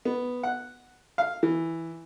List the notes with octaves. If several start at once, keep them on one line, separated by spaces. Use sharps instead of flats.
B3
F#5
F5
E3